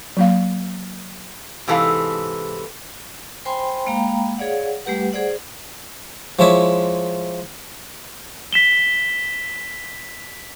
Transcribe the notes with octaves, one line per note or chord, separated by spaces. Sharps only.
F#3 A#3 F5
G#2 C3 E3 A4 F5
C5 G5 G#5 B5 C6
G#3 A#3 F5 G5 A#5 B5
G#4 C#5 D5 F5 F#5
G3 A3 G4 B4 F#5
G#4 C5 D5 F#5
F3 G#3 E4 C#5 E5 D6
B6 E7 G7